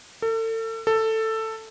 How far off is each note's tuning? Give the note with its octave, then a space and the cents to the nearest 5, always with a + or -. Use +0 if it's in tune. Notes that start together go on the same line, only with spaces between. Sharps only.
A4 +35
A4 +10